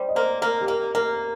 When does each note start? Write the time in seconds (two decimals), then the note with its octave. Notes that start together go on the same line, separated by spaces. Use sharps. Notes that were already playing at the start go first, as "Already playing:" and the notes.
Already playing: G3 C5
0.09 D#5
0.15 A#3 C5
0.42 A#3 A#4
0.61 G4
0.68 A#3 A#4
0.95 A#3 A#4